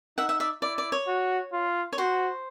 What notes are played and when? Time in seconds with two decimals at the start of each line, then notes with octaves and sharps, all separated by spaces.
0.18 D#4 E5 F#5
0.29 E5 F#5
0.40 D5 E5
0.62 E4 D5
0.78 D5
0.92 C#5
1.07 F#4
1.52 F4
1.93 C#5
1.98 F#4 C5